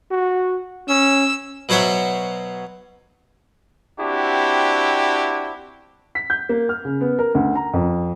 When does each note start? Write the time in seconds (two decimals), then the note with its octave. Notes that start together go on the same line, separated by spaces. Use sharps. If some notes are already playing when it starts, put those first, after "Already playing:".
0.11 F#4
0.88 C#4 E6
1.69 B2 F#3 C5 C#5 E5 F#5
4.00 C4 D4 E4 F#4 G4
6.15 B6
6.30 G6
6.49 A#3
6.69 F6
6.85 C#3
7.01 B3
7.19 A#4
7.35 D2
7.55 A#5
7.73 F2